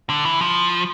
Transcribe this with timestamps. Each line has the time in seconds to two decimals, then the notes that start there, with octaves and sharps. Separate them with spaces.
0.10 D3
0.25 E3
0.41 F3